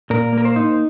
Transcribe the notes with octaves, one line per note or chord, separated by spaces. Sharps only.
A#2 A#4
A#3
A#4
C5
D#4